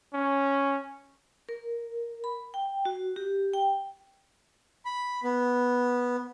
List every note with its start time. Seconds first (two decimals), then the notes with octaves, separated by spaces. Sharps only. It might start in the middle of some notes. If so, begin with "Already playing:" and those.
0.13 C#4
1.49 A#4
2.24 B5
2.54 G5
2.85 F#4
3.16 G4
3.54 G5
4.85 B5
5.24 B3